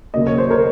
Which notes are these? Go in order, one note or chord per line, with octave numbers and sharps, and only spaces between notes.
D#2 C#3 F#3 A#3 D#5
C#5
C5
A#4 C#5